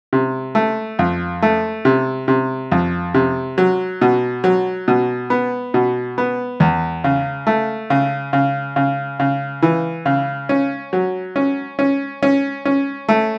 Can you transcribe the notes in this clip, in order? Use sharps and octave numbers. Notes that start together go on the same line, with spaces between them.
C3
A3
F2
A3
C3
C3
F2
C3
F#3
B2
F#3
B2
B3
B2
B3
E2
C#3
A3
C#3
C#3
C#3
C#3
E3
C#3
C#4
F#3
C#4
C#4
C#4
C#4
A3